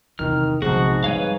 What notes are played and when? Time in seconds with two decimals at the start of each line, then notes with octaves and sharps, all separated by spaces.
0.19 E2 C3 D#3 F6
0.62 B1 G#2 C3 F3 F#4 G#4
1.04 G3 B4 C#5 F5